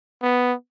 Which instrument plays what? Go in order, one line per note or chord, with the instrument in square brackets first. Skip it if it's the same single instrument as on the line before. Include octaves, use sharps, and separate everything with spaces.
[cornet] B3